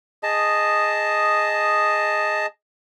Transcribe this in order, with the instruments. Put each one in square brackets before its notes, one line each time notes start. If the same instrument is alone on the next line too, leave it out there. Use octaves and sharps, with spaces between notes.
[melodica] G#4 D#5 A5